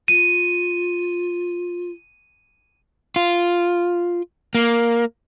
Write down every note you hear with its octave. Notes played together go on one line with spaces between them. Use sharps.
F4 D#7
F4
A#3